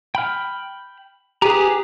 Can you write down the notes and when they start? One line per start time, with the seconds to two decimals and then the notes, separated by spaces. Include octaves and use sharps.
0.15 G5 B5 F6
1.42 G4 G#4 B4 G#5 A#5